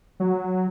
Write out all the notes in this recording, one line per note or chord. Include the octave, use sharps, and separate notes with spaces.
F#3